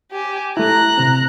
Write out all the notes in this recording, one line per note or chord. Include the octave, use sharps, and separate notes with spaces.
G4 G#5
A3 E4 A#5 F#6
C3 C4